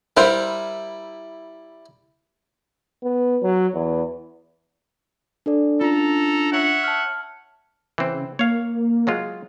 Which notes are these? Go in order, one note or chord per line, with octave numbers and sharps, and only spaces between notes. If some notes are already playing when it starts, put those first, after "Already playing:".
G3 E4 A#4 C5
B3
F#3
E2
D4 A4 D5
C#4 D4 F4 A4 A#5
C#5 E5 F#5
A5 F6
C#3 E3 C4
A#3 C#5 F5
F#3 G#3 F4